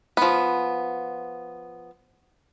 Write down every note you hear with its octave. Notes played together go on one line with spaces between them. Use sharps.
F3 B3